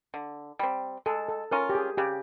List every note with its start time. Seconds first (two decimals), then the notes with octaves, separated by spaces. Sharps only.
0.14 D3
0.59 G3 C4
1.06 G#3 A4
1.28 A4
1.51 C#4 F4 A#4
1.69 G4
1.75 G#4
1.97 C#3 G4